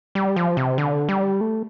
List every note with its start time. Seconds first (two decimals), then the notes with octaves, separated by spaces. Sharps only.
0.15 G3
0.36 F3
0.57 C3
0.78 D3
1.09 G3
1.41 A3